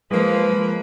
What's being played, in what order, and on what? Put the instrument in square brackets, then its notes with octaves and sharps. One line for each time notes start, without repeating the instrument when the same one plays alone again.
[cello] F3 [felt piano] G#3 [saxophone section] A#3 B4